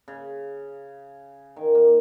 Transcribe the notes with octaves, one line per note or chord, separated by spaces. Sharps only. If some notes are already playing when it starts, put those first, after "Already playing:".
C#3
D#3
A#3